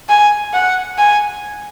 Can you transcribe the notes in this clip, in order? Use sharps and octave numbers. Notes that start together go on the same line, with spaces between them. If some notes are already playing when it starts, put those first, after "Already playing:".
G#5
F#5
G#5